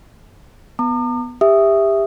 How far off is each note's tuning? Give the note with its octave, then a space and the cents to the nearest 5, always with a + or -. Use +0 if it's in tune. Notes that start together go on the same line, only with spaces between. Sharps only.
B3 +0 A#5 -40 D6 +45
G4 +25 E5 +0 D#6 -10